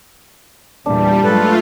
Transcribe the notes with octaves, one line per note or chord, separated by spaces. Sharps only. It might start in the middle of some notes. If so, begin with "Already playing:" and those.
E2 A#2 E3 G3 D4
G#2 F#3 G#3 A3 F4 A4 B4